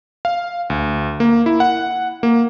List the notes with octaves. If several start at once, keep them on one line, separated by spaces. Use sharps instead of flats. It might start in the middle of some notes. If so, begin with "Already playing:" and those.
F5
D2
A#3
E4
F#5
A#3